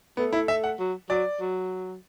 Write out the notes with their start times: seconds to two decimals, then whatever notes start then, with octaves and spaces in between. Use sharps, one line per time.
0.17 A3 B3
0.33 E4
0.48 E5
0.64 F#5
0.79 F#3
1.10 F#3 D5
1.40 F#3